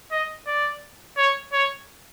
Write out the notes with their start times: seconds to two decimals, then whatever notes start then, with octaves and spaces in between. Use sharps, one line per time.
0.12 D#5
0.47 D5
1.17 C#5
1.53 C#5